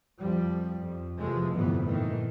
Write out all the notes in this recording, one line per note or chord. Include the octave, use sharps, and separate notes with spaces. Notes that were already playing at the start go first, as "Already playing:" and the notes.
F2 F3 G3
F2
E2 C3 F3 G#3 A3
G1 F2 A2 C3 E3 B3
A#2 D#3 E3 A3